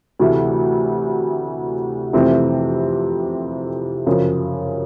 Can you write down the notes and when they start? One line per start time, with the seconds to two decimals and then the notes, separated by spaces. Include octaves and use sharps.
0.19 D2 C3 E3 A3
2.13 F2 C3 E3 A3 C4
4.07 F#2 C#3 F3